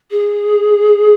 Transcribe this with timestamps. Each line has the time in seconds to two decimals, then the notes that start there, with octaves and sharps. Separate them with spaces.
0.11 G#4